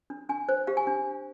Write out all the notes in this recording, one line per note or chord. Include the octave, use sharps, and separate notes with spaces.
D4
D4 G#5
C5
G4 F5
G#5
D4